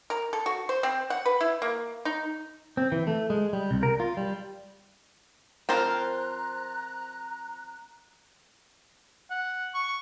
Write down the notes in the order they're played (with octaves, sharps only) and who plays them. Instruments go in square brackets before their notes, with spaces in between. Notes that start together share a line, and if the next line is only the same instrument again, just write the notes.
[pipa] A#4
A4
F#4
C5
C4
F#5
B4
E4
A#3
D#4
[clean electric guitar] C4
E3
A3
G#3
G3
C2
A#4
F4
G3
[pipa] F3 C4 F4 [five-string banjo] A#4 C5 [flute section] A#5 F#6
[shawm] F#5
C#6